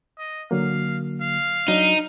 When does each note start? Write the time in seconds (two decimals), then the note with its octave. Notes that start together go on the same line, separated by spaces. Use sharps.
0.18 D#5
0.51 D3 F#3 A#3 F5
1.21 F5
1.68 F#3 D4 D#4